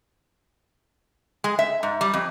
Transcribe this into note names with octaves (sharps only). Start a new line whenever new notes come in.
G#3
E5
G#2
G3
F2